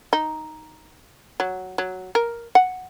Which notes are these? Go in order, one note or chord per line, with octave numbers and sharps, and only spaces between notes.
D#4
F#3
F#3
A#4
F#5